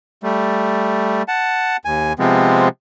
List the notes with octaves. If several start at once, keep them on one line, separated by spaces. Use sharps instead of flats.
G3 A3
F#5 A5
D#2 G#5
C3 F3 G#3 B3 C4